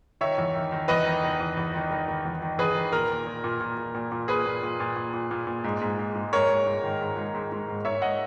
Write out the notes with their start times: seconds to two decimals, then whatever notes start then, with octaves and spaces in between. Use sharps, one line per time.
0.21 D#3 C#5 E5
0.38 E2
0.55 D#3
0.72 D#3
0.88 E2 B4 D#5
1.06 D#3
1.23 D#3
1.40 E2
1.57 E2
1.74 D#3
1.91 D#3
2.08 D#3
2.25 E2
2.42 D#3
2.58 E2 G#4 B4
2.75 D#3
2.92 A#2 A#4
3.09 A#2
3.27 A#2
3.44 A#2
3.61 A#2
3.77 A#2
3.95 A#2
4.12 A#2
4.28 A#2 G#4 B4
4.46 A#2
4.63 A#2
4.80 A#2
4.96 A#2
5.13 A#2
5.31 A#2
5.47 A#2
5.64 G#2
5.81 G#2
5.99 G#2
6.15 G#2
6.33 G#2 A#4 C#5
6.49 G#2
6.67 G#2
6.83 D#3
7.01 G#2
7.17 G#2
7.34 G#2
7.52 G#2
7.68 G#2
7.85 G#2 C#5 E5
8.02 D#5 F#5